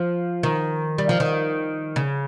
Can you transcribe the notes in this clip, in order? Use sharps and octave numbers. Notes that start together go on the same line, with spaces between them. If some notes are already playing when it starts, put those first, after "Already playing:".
Already playing: F3
D#3
G3
F3
D#3
C#3